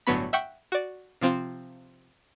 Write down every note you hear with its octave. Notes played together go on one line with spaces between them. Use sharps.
G1 A2 D3 F#3 B3 B5
E5 F#5 G5 C#6
F#4 D5
C3 F3 C4 F4